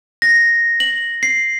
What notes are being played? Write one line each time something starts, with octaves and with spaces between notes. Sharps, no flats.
A#6
F#7
C7